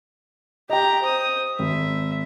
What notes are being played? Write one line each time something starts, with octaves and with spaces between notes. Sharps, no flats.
G4 D#5 G5 A#5
C5 D#6
G#1 E5